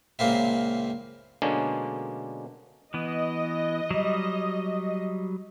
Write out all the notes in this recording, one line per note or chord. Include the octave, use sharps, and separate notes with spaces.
C#2 A#2 A#3 C4 E4
B2 D3 G#3 A#3 C#4 D4
E3 B3 D#5
F#3 G3